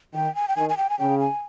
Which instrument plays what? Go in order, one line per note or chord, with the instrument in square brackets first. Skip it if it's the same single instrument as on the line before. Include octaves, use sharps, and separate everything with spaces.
[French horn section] D#3 [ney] G5
[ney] G#5
G5
[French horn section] D#3 [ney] G#5
[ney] G#5
G5
G#5
[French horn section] C#3 [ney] G5
[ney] G#5